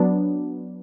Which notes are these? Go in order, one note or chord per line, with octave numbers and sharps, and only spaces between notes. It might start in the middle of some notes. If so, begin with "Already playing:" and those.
Already playing: F#3 B3 D4